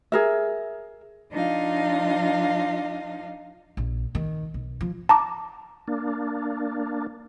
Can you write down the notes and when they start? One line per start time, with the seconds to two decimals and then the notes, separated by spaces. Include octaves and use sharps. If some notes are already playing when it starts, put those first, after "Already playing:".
0.12 G#4 A#4 E5
1.32 F3 D4 D#4 F4 D#5 F5
3.77 A#1
4.15 D#3
4.54 B1
4.81 F3
5.09 A5 A#5 D6
5.88 A#3 D4